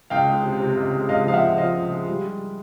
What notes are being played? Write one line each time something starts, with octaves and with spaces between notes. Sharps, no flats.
C#2 F5 G5
G#3
C3
C3
C#2
G#3
C#2 D#5 F5
F3 F5
E5 F#5
C#2
F3 D#5 F5
C#2
G#3
G3
G3